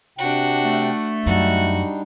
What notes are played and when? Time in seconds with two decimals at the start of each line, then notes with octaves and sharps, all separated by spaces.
0.18 C3 D4 F#4 G5
0.65 A3
1.26 F#2 G3 D4 D#4 F#4